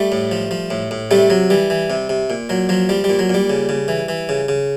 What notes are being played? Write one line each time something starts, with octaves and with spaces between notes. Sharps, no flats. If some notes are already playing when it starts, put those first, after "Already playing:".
Already playing: G3 A3
A2
F3
F3
A2
A2
C3 G3 A3
C3 F#3
E3 G3
E3
C3
C3
A#2
A#2 F#3
F3 F#3
F3 G3
G3
A#2
F#3
A#2 G3
C#3
C#3
E3
E3
C#3
C#3